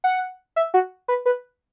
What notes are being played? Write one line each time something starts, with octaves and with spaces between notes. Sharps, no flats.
F#5
E5
F#4
B4
B4